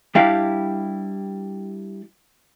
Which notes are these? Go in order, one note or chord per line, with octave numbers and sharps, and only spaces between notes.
G3 D4 E4 G4 F5